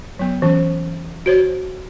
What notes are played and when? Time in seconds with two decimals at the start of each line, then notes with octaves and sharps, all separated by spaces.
0.19 F#3 B3
0.42 E3 C#4
1.26 F#4 C5 C#5